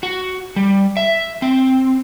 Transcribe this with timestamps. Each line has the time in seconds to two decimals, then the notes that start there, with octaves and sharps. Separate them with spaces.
0.03 F#4
0.56 G3
0.97 E5
1.42 C4